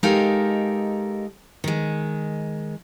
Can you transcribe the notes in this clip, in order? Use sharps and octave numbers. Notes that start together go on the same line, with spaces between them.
G#3 D#4 G4 A4 A#4 F5
D#3 G#3